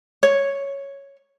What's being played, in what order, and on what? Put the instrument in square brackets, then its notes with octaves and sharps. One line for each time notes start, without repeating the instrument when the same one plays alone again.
[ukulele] C#5